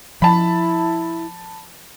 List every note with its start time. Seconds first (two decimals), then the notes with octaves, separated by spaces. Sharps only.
0.22 F3 E4 A5 B5